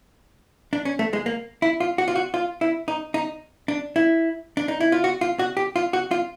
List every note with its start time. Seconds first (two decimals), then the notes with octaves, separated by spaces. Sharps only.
0.73 D4
0.85 C#4
0.99 A3
1.13 G#3
1.26 A#3
1.62 E4
1.80 F4
1.98 F#4
2.08 F4
2.16 F#4
2.34 F4
2.61 E4
2.88 D#4
3.14 D#4
3.68 D4
3.96 E4
4.57 D4
4.68 D#4
4.81 E4
4.92 F4
5.04 F#4
5.21 F4
5.39 F#4
5.57 G4
5.76 F4
5.93 F#4
6.11 F4